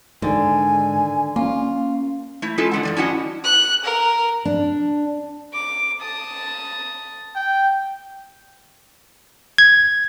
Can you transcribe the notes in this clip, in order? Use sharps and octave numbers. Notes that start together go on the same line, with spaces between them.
G#2 D3 D#3 G#5
A#3 C#4 F4
A3 E4
G#3 C#4 E4 F4 A4
D3 G#3 F#5
G2 F3 D5
C#4 D4 E4 F#4 D#5 F#5
F#6
A#4
D4
D6
A5 D#6
G5
G#6